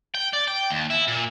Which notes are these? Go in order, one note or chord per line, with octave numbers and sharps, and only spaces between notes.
G5
D5
G5
D#2
E4
A#2